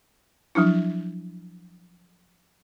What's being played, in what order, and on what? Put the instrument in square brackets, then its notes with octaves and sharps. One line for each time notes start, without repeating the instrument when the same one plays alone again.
[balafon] F3 F#3 D4 E4